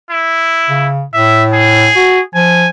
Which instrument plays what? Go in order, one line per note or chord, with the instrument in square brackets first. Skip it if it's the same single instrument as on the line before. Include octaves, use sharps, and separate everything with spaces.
[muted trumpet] E4
[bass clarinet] C#3
[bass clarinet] A2 [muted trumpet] E5
[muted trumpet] G#4
[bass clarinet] F#4
[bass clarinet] F3 [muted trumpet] G#5